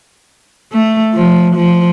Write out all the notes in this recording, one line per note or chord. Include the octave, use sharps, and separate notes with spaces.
A3
F3
F3